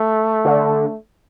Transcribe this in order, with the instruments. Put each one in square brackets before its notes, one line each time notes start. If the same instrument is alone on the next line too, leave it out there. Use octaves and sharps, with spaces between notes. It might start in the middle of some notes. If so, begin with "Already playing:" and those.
Already playing: [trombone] A3
[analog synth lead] D3